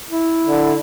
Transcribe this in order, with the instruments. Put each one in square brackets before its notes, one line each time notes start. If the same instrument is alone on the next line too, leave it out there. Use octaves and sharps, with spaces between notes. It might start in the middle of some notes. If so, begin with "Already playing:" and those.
[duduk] E4
[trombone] D3